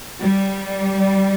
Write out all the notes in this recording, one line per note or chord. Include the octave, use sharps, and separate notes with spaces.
G3